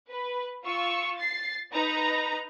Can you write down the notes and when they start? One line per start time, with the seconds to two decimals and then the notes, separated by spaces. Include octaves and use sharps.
0.10 B4
0.64 F4 C#6 E6
1.16 A6 C7
1.72 D#4 B4 A#5